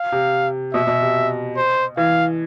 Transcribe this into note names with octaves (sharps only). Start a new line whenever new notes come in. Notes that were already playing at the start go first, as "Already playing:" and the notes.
Already playing: F5
C3
B2 E5
B2
C3
C5
E3 F5